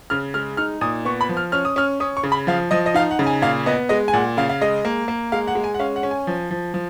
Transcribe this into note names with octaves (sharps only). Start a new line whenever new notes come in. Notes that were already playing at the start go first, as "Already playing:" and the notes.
C#3 F6
G#3 F6
D#4 F6
A#2 D#6
B3 C#6
B5
F3
F6
C#4 F6
D#6
C#4 F6
C#4 D#6
C#6
C#3
B5
F3 F5
F3 D#5
D#5
D#4 F5
F#5
C#3
G#5
A#2 F5
B3 D#5
G#3 D#5
G#5
A#2 F#5
C#3 F5
F5
G#3 D#5
A#3
A#3
G#3 F5
F#5
G#3
G#5
F#5
C#4 F5
F#5
C#4
G#5
F3
F3
F3